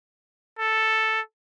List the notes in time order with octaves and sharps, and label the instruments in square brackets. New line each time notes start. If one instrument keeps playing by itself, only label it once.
[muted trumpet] A4